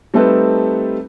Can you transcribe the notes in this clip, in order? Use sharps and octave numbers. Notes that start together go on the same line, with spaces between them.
G3 A3 C4 D#4 A4 B4